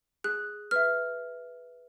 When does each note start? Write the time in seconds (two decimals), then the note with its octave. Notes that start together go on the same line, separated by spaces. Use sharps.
0.24 G#4 F#6
0.71 B4 E5 F6